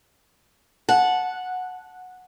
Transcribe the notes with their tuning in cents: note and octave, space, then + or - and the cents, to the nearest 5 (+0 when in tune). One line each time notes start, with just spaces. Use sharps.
F#5 -10 A5 -15